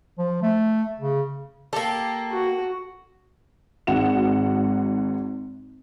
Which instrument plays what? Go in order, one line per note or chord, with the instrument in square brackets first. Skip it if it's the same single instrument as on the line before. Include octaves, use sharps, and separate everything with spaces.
[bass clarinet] F3
A3
C#3
[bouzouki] A#3 G4 [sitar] A4
[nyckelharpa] F#4
[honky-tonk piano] G#1 G#2 F#4 F#5 E7